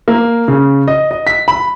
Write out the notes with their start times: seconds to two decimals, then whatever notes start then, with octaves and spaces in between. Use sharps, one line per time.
0.08 A#3
0.48 C#3
0.88 D#5
1.11 D#5
1.27 B6
1.48 B5